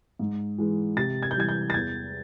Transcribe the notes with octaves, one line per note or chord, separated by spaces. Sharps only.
G#2
E3 G#3
C3 A6
G#6
G6
E3 G3 G#6
G6
A6
E2 G#6